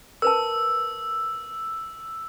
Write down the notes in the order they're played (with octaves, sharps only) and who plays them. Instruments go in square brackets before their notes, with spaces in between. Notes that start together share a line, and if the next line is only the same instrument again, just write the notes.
[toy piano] A#4 B4 A5 [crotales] E6